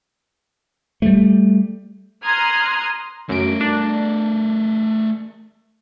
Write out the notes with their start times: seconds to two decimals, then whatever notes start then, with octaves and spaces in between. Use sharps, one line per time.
1.02 G3 A3
2.25 A#5 C6 D#6 F6 F#6 G#6
3.29 F#2 A3 A#4 D7
3.61 D4